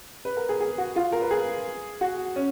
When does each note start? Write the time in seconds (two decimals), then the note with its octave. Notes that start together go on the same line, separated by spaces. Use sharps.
0.25 B4
0.37 A#4
0.49 G#4
0.61 G#4
0.78 F#4
0.96 F4
1.12 A#4
1.22 B4
1.31 G#4
2.01 F#4
2.36 C#4